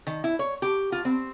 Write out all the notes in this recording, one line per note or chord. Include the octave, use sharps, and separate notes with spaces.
D#3
E4
C#5
G4
F4
C4